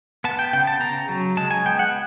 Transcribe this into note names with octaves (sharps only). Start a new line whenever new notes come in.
B3 A5
G5
C#3 G5
A5
C#3 A#5
F#3
G#3 A5
G#5
B3 G5
F#5